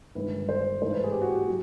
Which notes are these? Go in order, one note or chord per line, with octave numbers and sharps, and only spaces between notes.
G1 G2 D#3 G#3 B4
C5
G#2 E3 A3 C5
B4
G#4
G4
F#4
G4
F#3